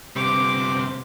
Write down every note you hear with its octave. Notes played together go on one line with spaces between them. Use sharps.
C3 G3 B3 D6